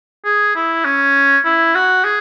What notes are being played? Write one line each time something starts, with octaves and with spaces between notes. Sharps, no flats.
G#4
E4
C#4
E4
F#4
G#4